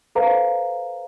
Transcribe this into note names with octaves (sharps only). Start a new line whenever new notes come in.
A4 B4 C5 F5 A#5